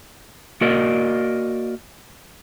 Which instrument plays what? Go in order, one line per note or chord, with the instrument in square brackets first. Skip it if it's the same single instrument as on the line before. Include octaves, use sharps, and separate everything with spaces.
[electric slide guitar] A#3 F#4 A#4 D5 D#5